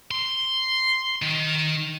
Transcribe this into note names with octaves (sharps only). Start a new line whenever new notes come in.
C6
D#3